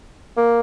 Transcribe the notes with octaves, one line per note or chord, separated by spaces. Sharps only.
A#3